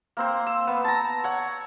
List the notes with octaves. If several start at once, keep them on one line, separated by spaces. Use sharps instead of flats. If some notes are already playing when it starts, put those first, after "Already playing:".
A#3 C4 C5
E6
B3
A5 A#5
C#5 F#5